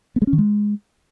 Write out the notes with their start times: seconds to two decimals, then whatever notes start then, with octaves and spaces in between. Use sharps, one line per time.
0.16 B3
0.22 G#3
0.27 C#4
0.33 D#3
0.38 G#3